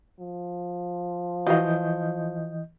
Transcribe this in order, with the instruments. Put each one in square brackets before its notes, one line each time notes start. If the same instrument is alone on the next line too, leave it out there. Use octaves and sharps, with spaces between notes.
[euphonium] F3
[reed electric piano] E3 D#5 G6 [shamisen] F#4 F5